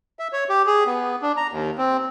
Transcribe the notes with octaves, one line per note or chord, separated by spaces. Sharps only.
E5
C#5
G4
G#4
B3
D4
A#5
D#2
C4